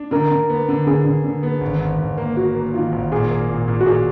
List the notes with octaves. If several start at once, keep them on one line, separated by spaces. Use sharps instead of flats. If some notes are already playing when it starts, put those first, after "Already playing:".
Already playing: D4
D3 A#4
D3
B3
D3
D3 G#4
D3
D3
B3
G#1
G#1
G#1
A#3
A#3 F#4
A#3
D#3 F4
G#1
A#2 G#4
A#3
A#2
A#2
F#4
A#2 G#4